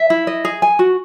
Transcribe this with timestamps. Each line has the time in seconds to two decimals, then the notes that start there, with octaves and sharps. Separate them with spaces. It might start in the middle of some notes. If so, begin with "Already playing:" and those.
Already playing: E5
0.10 E4
0.27 D#5
0.45 G#4
0.62 G#5
0.79 F#4